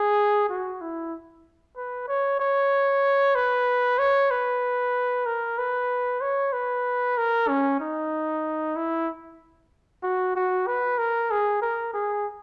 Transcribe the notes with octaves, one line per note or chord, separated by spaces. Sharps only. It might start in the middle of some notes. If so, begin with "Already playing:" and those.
Already playing: G#4
F#4
E4
B4
C#5
C#5
B4
C#5
B4
A#4
B4
C#5
B4
A#4
C#4
D#4
E4
F#4
F#4
B4
A#4
G#4
A#4
G#4